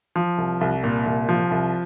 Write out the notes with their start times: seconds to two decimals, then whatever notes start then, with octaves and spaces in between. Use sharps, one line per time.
0.16 F3
0.38 C2
0.61 C2
0.84 A#2
1.06 C2
1.29 F3
1.51 C2